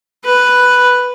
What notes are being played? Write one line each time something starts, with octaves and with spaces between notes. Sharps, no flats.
B4